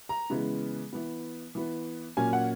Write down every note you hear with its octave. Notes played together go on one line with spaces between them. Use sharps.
A#5
C#3 E3 G#3 B3
E3 B3
E3 B3
A#2 F#3 A#3 C#4 G#5
F#5